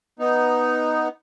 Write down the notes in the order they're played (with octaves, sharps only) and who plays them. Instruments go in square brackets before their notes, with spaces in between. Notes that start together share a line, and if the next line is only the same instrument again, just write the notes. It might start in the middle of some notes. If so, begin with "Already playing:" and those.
[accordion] B3 D#4